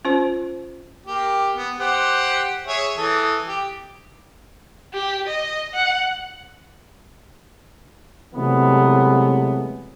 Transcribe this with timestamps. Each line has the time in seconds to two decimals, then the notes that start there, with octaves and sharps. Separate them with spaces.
0.05 C#4 F4 C5
1.06 A#3 G4
1.57 B3
1.79 G4 C5 F#5
2.67 G#4 C#5 E5
2.98 E3 A4 D#6
3.47 G4
4.94 G4
5.27 D#5
5.74 F#5
8.35 C3 E3 F#3 G#3 A3 B3